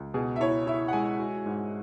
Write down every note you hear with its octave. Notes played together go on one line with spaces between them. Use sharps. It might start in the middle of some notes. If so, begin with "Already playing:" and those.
Already playing: C#2
B2 G#4
E5
E4 C#5
E4 E5
F#5
G#3 G#5
F#4
G#2